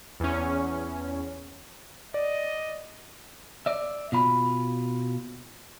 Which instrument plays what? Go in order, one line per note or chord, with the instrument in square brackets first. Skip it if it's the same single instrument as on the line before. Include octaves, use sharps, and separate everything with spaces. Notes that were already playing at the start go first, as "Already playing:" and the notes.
[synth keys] E2 C#4
[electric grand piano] D5 [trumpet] D#5
[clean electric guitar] D5 E5
B2 F4 B5